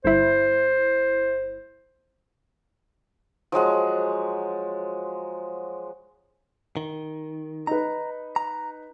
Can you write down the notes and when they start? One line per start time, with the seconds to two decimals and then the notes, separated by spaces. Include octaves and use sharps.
0.05 G1 E4 C5
3.52 F3 F#3 G#3 F#5
6.77 D#3
7.67 D#4 B4 A#5
8.36 A#5